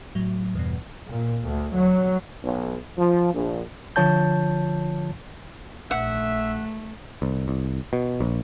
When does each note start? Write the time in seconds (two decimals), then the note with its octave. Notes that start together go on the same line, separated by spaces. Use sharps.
0.15 A2 F#3
0.55 E2 G2 B2
1.09 A#2
1.47 D2
1.76 F#3
2.44 B1
2.98 F3
3.34 A#1
3.96 D3 F3 F4 C#5 A5 G6
5.91 A#1 A3 E5 F#5
7.22 C2
7.48 C2
7.93 B2
8.21 A#1